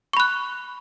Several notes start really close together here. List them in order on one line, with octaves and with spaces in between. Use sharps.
C#6 B5 F#6